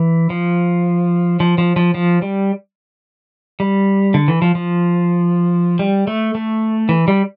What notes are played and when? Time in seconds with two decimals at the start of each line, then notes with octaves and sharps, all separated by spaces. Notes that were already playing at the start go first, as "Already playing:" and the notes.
Already playing: E3
0.30 F3
1.40 F3
1.58 F3
1.76 F3
1.94 F3
2.22 G3
3.60 G3
4.14 D3
4.28 E3
4.42 F3
4.55 F3
5.79 G3
6.07 A3
6.35 A3
6.89 E3
7.08 G3